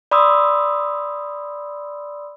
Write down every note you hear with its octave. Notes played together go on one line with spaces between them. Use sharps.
D5 B5 C6 D#6 E6